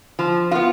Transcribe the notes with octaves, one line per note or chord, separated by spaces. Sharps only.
F3
B3 F4